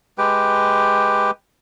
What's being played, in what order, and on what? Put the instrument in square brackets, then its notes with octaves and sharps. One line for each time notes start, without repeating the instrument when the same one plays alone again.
[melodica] G#3 G4 B4 G5